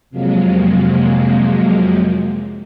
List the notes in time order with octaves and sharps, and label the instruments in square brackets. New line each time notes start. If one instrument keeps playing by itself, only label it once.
[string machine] F2 C3 F3 F#3 G#3 A#3